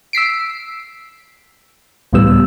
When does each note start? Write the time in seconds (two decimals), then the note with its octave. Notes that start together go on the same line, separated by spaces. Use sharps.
0.13 E6 B6 C7 D7
2.13 C#2 A2 E3 G3 B3 E6